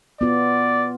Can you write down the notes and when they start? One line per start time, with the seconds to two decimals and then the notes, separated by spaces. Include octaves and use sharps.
0.21 B3 F4 D5